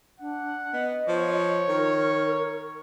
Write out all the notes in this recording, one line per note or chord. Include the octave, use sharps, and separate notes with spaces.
D4 F#5
B3 D#5
F3 C#5
D#3 A#4